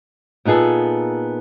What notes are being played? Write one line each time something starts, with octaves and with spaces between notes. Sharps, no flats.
A#2 B3 D#4 G#4 A4